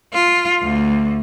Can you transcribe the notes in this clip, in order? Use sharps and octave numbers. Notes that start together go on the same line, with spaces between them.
F4
D2